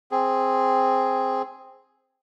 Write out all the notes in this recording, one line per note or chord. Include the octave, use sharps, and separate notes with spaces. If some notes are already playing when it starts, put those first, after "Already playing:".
C4 G#4